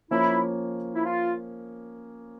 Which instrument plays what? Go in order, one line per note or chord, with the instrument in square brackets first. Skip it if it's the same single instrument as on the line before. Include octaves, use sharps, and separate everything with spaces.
[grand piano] F3 A#3 C#4 [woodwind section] E4
[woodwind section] E4
F4